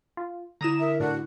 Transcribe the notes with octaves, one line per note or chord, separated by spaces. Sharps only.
F4
D3 E4 A#5 D#6 E7
A#4 E5
A2 D4 F#4